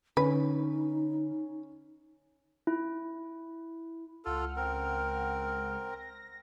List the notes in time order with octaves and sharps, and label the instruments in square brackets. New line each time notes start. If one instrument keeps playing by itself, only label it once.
[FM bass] D3 [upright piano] C#4 [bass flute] D#4 [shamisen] B4
[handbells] E4
[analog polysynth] C#2 F#5 F6 [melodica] F4 A4
[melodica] C4 A#4
[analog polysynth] A#6